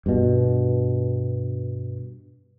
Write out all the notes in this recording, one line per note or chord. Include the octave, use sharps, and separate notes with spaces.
G2 B2